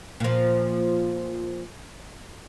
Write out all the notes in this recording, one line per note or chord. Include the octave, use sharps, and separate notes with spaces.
A#2 F3